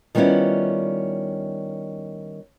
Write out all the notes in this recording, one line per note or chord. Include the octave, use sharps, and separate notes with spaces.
D#3 G3 B3 C#4 E4 F4